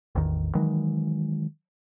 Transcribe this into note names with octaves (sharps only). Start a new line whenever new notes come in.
A1 E2 D#3
D#3 E3 F#3 G#3